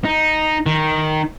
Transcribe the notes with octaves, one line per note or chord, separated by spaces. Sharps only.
D#4
D#3